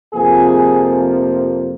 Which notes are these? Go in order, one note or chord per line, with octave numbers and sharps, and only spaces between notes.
F2 C3 F3 A#3 G#4